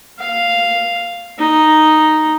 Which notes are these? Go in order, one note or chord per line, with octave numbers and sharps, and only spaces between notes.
F5
D#4